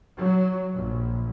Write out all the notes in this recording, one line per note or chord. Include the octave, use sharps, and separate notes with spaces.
F#3
A#1